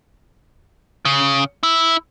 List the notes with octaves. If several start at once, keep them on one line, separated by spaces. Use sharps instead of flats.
C#3
E4